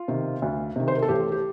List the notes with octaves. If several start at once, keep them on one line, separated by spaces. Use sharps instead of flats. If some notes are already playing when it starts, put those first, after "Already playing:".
Already playing: F4
C3 D#3
D2
C3 D#3
C5
A#4
A4
A1 G4
G4